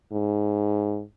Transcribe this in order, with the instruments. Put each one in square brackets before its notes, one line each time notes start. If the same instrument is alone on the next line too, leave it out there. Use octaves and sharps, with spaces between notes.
[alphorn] G#2